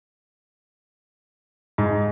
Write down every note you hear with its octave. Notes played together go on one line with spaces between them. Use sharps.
G#2